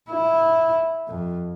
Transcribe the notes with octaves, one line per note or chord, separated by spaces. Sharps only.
E4
F2